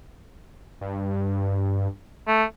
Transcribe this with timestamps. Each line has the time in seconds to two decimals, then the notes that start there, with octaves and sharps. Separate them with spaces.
0.81 G2
2.28 A3